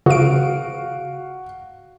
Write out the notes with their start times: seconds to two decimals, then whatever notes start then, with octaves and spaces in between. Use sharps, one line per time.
0.06 C#3 F#4 F5 D7